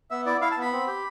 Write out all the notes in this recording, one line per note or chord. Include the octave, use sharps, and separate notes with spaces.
B3 E5
E4 D5
E4 F5
A5
B3 B5
C4
G4